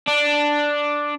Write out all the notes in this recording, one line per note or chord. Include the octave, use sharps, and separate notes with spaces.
D4